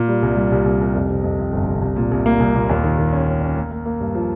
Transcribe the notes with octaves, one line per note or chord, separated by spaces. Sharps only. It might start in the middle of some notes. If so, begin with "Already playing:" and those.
Already playing: A#2
G3
C2
G3
C2
C2
C2
F2
C3
F2
F2
G1
C3
C2
A#2
C2
A#3
C2
A#2
D#2
D#3
D#3
C#4
C#4
C#4
A#3
A#3
A#3
G2
F3